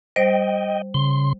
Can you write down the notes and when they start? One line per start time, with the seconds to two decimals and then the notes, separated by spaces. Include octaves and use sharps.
0.16 G3 C5 D#5 G5
0.94 C#3 C6